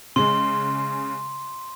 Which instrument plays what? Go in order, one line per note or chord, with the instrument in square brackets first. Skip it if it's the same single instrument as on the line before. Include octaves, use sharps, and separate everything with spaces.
[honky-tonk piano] C#3 G#3 [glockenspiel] C6